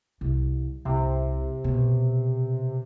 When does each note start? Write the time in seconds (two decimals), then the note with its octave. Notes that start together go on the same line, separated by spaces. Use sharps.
0.21 C2
0.85 C2 C3
1.64 B2